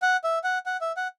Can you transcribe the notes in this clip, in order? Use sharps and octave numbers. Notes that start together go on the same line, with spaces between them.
F#5
E5
F#5
F#5
E5
F#5